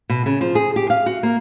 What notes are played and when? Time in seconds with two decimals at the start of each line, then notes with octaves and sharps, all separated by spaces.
0.10 B2
0.26 C#3
0.41 F3
0.55 G#4
0.76 G4
0.90 F5
1.06 F#4
1.23 A#3